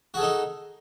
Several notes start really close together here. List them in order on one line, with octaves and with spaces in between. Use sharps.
F#4 G#4 A4 D#4